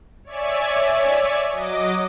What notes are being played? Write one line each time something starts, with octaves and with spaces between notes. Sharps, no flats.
C#5 D5 E5 G#5
F#3 D#5 D6